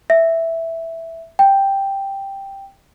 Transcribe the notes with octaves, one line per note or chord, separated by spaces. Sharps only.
E5
G5